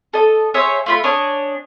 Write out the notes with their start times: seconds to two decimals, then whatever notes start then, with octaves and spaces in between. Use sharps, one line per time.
0.13 A4 D#5
0.54 G#4 C5 C#5 E5
0.86 A3 F4 B5
1.04 D4 C#5 D#5 G#5